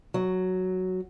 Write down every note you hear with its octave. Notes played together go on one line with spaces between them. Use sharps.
F#3